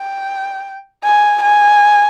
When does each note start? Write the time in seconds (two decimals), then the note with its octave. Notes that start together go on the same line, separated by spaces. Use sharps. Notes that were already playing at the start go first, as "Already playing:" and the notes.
Already playing: G5
1.04 G#5
1.42 G#5